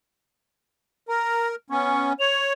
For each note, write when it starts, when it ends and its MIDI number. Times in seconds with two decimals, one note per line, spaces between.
1.08 1.55 70
1.08 1.47 82
1.70 2.13 59
1.70 2.13 61
1.70 2.09 85
2.20 2.53 73
2.20 2.53 101